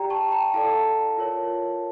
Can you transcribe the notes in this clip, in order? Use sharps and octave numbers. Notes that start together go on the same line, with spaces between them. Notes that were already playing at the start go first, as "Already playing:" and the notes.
Already playing: G4 D5 G5 A#5
A5 C#6
G5 A#5
E4 A4 D5 F5 A5
F4 A#4 C#5